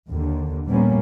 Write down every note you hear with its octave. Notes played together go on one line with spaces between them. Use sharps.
D#2 D3
A#2 F3 G3 A#3 B3 C#4